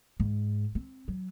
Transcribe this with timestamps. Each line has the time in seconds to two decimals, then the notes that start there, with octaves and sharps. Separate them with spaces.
0.20 G#2
0.75 C4
1.08 F#3